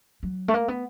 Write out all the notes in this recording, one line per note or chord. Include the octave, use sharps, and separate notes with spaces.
F#3
A3
A#3
B3